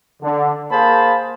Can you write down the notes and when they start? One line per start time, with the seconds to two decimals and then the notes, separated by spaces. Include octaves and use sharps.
0.22 D3
0.70 A#3 G#4 C5 F5 A5 B5